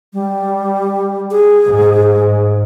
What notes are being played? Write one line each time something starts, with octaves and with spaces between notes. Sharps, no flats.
G3
G#4
G#2